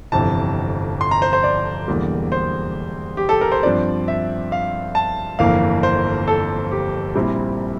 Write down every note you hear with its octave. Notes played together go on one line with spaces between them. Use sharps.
G1 F2 C3 E3 A5
C6
A#5
C5
C5
D5
E1 E2 D3 G3 A#3
C5
G4
A4
A#4
C5
G2 F3 C4 D5
E5
F5
A5
G1 F2 E3 A#3 F5
C5
A4
G4
A#1 A#2 G3 C4 E4